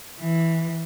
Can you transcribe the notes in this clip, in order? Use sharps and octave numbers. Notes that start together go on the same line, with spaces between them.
E3